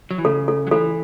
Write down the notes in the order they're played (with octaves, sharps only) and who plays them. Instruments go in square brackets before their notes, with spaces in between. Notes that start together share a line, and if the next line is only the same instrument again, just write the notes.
[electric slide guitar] F#3
E3
[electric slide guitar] C#3 [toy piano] A4
[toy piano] A4
[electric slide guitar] F#3
[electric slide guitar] E3 [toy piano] A4